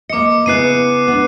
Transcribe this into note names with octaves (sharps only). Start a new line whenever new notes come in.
A#3 D#5 D6 C#7
C#3 B3 E4 F#6 C7 D#7
B3 D4